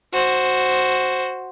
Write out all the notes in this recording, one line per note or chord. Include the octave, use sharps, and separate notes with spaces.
F#4 C5